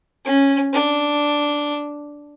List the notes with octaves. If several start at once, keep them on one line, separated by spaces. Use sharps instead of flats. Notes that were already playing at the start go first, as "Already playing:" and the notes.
C#4
D4